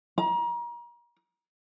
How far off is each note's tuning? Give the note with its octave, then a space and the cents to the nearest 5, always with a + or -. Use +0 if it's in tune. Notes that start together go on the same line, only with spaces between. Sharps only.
A#5 +35